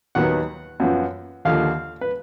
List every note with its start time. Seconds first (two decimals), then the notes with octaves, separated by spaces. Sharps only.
0.15 D#2 D#3 F#3 B3 F#5
0.80 F#2 F3 B3
1.45 D#2 D3 F3 A#3 F5
2.01 B4